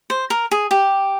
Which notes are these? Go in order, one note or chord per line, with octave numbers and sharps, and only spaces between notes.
C5
A#4
G#4
G4